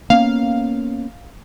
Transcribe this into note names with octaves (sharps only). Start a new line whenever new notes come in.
A#3 B3 C#4 F5